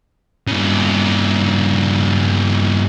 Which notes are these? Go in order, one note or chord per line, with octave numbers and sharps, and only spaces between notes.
G2 C#3